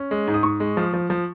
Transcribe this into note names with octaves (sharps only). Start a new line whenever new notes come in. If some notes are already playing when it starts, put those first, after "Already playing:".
Already playing: C#4
G#3
G#2
D#6
G#2 C#6
G#3
F3
F3
F3